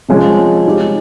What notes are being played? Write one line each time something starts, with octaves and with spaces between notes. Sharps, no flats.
C3 F3 G#3 C#4
G#3 D#4 G4